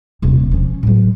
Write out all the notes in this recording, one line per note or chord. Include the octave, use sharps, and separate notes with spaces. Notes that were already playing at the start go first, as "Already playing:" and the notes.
D#1 C3
F3 C#4
A2 F#3